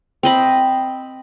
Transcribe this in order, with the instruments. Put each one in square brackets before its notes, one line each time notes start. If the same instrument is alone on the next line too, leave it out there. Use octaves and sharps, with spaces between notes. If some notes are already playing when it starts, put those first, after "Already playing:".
[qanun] C4 D#5 B5